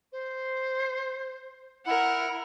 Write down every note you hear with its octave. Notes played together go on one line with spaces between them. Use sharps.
C5
E4 A#4 F#5